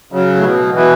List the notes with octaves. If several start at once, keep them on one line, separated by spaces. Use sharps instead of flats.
C#3 F#3
A2
B2
B2 E3